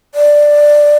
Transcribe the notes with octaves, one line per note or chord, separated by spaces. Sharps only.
D5